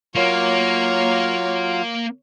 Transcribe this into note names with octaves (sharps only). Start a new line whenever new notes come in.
F#3 A#3 F4 C#5